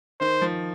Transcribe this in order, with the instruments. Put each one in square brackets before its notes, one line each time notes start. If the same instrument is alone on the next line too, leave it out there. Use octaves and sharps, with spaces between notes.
[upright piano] D#3 [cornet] C5
[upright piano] F3